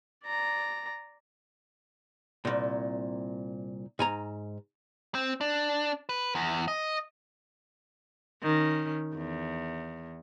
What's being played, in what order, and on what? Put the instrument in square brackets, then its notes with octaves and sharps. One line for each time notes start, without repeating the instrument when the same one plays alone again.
[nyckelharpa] D5 A#5
[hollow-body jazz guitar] C2 A#2
G#2 G#5 A#5
[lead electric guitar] C4
D4
B4
E2
D#5
[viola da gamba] D#3 C#4
E2